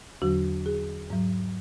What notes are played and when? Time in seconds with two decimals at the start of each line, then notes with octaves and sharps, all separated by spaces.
0.22 E2 D3 F#3 F#4
0.66 G#4
1.10 G#2 F#3